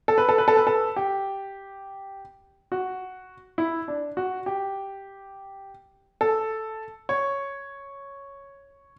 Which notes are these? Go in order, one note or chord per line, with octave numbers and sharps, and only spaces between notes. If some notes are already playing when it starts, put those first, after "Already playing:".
A4
B4
A4
B4
A4
B4
A4
G4
F#4
E4
D4
F#4
G4
A4
C#5